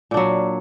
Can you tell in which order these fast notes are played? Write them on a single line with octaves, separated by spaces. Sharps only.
A#2 D4 F#3